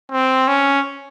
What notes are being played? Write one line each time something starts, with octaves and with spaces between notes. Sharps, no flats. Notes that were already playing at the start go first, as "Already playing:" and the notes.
C4
C#4